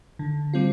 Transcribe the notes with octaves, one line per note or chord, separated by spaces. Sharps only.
D3
G3 C4 F4